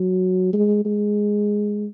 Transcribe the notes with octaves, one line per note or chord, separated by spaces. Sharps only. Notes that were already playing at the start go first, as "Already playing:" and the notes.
Already playing: F#3
G#3
G#3